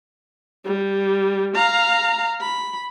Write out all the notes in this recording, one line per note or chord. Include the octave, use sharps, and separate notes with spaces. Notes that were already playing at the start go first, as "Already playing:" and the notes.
G3
F5 A#5
B5